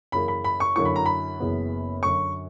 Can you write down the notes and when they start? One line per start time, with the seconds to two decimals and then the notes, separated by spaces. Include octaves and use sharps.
0.12 F#2 C#3 E3 A#3 B5
0.28 B5
0.44 B5
0.60 C#6
0.76 F#2 D3 F#3 A#3 E4 C#6
0.85 B5
0.96 A#5
1.06 B5
1.40 F#1 F#2 C#3 E3 B3
2.03 F#2 D3 F#3 C#6